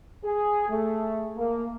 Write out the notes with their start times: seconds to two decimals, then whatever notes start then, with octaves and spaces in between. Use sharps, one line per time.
0.24 G#4
0.69 A3
1.37 A#3